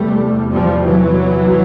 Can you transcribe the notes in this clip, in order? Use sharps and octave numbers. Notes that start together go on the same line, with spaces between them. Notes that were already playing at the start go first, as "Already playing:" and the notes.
Already playing: E2 C3 G3 A3
F3 G3
E3 F#3